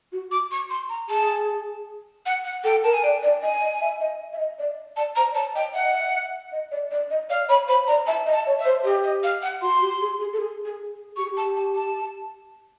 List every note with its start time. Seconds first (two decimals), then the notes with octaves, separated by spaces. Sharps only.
0.12 F#4
0.31 D6
0.51 C#6
0.70 C6
0.89 A#5
1.09 G#4 A5
2.26 F#5
2.45 F#5
2.64 A4 G5
2.84 A#4 A5
2.94 G#5
3.03 D5 G5
3.23 D5
3.42 D#5 G#5
3.61 D#5
3.81 E5
4.00 D#5
4.33 E5
4.39 D#5
4.59 D5
4.96 D5 A5
5.16 C5 A#5
5.31 D5
5.35 C#5 A5
5.55 D#5 G5
5.74 E5 F#5
5.83 D#5
5.92 E5
6.52 D#5
6.72 D5
6.91 D5
7.10 D#5
7.29 D5 F5
7.49 C#5 B5
7.68 C5 B5
7.87 D5 A#5
8.07 E5 A5
8.26 D#5
8.32 A5
8.46 C#5
8.59 E5
8.65 C5
8.84 G4 D#5
9.04 D#5
9.23 F5
9.42 F#5
9.62 F#4 C6
9.82 G4
10.01 G#4
10.20 G#4
10.33 A4
10.40 G#4
10.65 G#4
11.16 G4 C#6
11.25 G#4
11.32 G4
11.37 A5
11.56 A5
11.75 A5